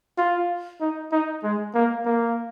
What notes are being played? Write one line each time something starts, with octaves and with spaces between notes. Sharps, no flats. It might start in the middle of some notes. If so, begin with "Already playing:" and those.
F4
D#4
D#4
G#3
A#3
A#3